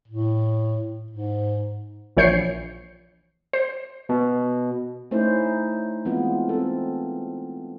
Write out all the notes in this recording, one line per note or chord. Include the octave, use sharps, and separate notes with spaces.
A2
G#2
A#1 E3 C#5 G6 C7 C#7
C5
B2
A3 C#4 D#4 E4 C5
E3 G#3 B3 C4 F4
C4 A4